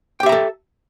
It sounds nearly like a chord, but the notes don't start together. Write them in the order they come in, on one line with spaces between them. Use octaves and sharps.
G5 G4 E5 A#5 A4